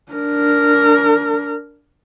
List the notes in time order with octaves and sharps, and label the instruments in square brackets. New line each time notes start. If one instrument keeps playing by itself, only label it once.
[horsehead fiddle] D4 A#4